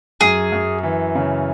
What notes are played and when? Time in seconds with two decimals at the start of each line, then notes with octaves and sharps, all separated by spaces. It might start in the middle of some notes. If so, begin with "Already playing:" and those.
0.21 F#2 G#4
0.52 F#2
0.83 E3
1.15 C#3